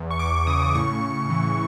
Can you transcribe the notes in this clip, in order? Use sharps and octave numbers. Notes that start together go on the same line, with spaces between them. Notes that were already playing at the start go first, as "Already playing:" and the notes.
Already playing: E2
C#6
E2 D6
C#3 D#6
A2 C#6
A2
E3